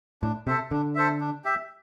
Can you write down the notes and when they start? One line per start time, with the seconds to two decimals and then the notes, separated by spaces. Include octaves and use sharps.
0.22 A2 D4
0.47 C3 A4 C5 E5
0.71 D3 D4
0.95 A4 C5 E5
1.20 D4
1.44 G4 E5